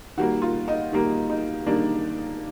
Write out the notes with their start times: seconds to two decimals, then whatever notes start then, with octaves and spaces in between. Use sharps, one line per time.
0.17 D#3 G3 A#3 F#4
0.42 F4
0.68 D#4
0.92 D#3 G3 A#3
1.30 D#4
1.67 D#3 G3 A#3 D4